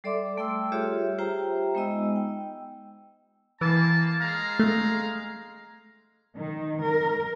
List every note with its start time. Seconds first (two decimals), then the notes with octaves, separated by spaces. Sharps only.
0.04 G3 A4 D5 E5 C6 D6
0.37 G3 A3 A4 G5 C6 E6
0.72 G3 F4 G4 G#4 C#5 E5
1.18 F4 G4 C5 E5 G5 A#5
1.75 G#3 B3 D#4 D#5 E6
2.16 G5
3.61 E3 A#3 A5
4.20 G#3 F5 A#5
4.59 A3
6.35 D#3
6.83 A#4